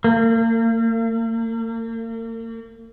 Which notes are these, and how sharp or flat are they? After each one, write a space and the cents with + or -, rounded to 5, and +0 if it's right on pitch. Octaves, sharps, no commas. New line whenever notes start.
A#3 -40